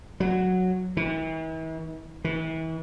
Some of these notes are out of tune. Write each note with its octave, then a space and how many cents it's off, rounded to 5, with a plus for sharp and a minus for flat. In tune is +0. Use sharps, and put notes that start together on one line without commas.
F#3 -5
E3 -40
E3 -35